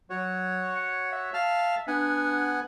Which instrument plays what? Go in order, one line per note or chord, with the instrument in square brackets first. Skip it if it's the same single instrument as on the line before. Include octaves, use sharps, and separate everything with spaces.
[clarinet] F#3 [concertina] F#4 C#5
[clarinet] F#5
E5
[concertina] F5 A5 F6
[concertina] B3 F#5 G#5 [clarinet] D4